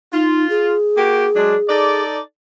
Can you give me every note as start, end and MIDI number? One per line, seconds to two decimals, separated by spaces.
0.13 0.48 63
0.13 0.74 65
0.50 2.03 68
0.97 1.27 58
0.97 1.27 66
0.97 1.27 67
1.36 1.56 54
1.36 1.56 56
1.36 1.56 62
1.69 2.20 63
1.69 2.20 69
1.69 2.20 74